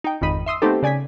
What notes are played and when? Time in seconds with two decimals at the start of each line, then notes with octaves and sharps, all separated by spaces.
0.04 D#4 G5
0.21 G#1 F2 D#3 D#4 B5 D#7
0.46 E5 C6 D#6 E6
0.62 A3 B3 C4 D#4 G4 A4
0.82 C#3 D5 G#5 G#6 B6